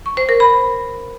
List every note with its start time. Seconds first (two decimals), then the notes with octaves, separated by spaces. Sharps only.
0.06 C#6
0.17 C5
0.29 A#4
0.40 B5